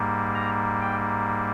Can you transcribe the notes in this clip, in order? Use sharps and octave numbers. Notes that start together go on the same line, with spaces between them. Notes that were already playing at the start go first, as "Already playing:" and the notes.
Already playing: G#2 G3 A#3
A#5
G5